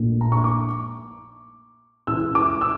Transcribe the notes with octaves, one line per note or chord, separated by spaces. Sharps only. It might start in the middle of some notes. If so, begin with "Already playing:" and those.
Already playing: A#1 A#2 A3 D4
A#5
C#6
D6
C#2 C#3 E3 E6
D6
E6